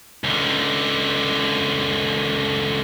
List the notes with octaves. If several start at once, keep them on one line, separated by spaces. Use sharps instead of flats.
C#2 D3